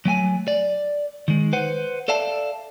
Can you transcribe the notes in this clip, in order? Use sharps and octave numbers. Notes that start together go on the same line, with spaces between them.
F#3 A3 G5 G#5
D5
D#3 G#3
B4 C5 F#5
A4 D5 E5 F5 A5